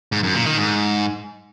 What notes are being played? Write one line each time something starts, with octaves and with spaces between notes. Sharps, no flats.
G#2
F#2
A#2
D#3
G#2